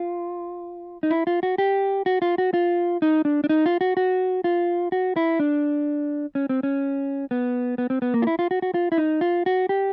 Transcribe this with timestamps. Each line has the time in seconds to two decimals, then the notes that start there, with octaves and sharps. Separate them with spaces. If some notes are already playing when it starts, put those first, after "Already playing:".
Already playing: F4
1.03 D#4
1.10 E4
1.27 F4
1.43 F#4
1.58 G4
2.06 F#4
2.22 F4
2.38 F#4
2.54 F4
3.02 D#4
3.25 D4
3.44 D4
3.49 D#4
3.66 F4
3.81 F#4
3.97 F#4
4.44 F4
4.92 F#4
5.16 E4
5.40 D4
6.35 C#4
6.49 C4
6.63 C#4
7.31 B3
7.78 B3
7.90 C4
8.02 B3
8.14 A#3
8.22 F4
8.27 E4
8.39 F4
8.51 F#4
8.62 F#4
8.74 F4
8.92 E4
8.98 D#4
9.21 F4
9.46 F#4
9.69 G4